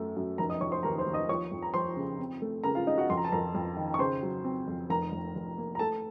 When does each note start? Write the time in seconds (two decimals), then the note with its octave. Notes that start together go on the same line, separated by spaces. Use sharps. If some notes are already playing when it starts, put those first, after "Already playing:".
Already playing: F#2 A3
0.16 F#2
0.38 F1 A#4 A#5
0.49 D#5 D#6
0.61 F1 C#5 C#6
0.72 C5 C6
0.83 D#2 A#4 A#5
0.98 C5 C6
1.06 D#2
1.13 D#5 D#6
1.29 F3 C#5 C#6
1.52 F2
1.62 A#5
1.74 F3 C5 C6
1.97 C#3
2.19 C4
2.42 A3
2.64 C#3 A#4 A#5
2.75 F4 F5
2.87 C#3 D#4 D#5
2.98 F#4 F#5
3.10 F2 C6
3.17 A#5
3.24 A5
3.32 F2 A#4 A#5
3.55 F2
3.77 D#3
3.94 C#6
3.99 C#3 C5 C6
4.22 F#3
4.45 C4
4.67 F2
4.90 F1 A#4 A#5
5.12 F1
5.35 F1
5.58 A#3
5.75 A#5
5.79 A3 A4 A5